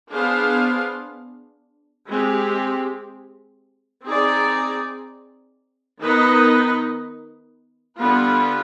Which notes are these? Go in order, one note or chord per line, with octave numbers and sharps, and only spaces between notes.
B3 D4 G#4 C5 F5
G#3 C4 G4
C4 D#4 G#4 D5
D#3 B3 D#4 B4 D#5
D3 G3 B3 F4 B4